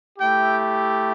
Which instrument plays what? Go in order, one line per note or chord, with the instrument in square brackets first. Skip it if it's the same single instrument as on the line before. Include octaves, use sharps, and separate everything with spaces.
[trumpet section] A3 E4 G4 G5